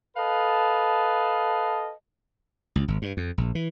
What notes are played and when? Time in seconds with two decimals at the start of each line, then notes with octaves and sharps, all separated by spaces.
0.16 A4 B4 D#5 F5 A5
2.76 C#2
2.88 G#1
3.02 G2
3.17 F2
3.38 A#1
3.55 E3